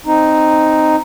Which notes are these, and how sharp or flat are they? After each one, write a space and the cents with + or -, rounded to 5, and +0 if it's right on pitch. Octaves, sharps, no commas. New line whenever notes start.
C4 +0 D#4 +0